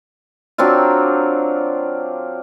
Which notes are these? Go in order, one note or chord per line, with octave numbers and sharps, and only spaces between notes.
F#3 C4 D4 F4